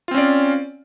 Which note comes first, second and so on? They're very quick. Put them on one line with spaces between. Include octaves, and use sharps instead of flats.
F4 C4 C#4 D5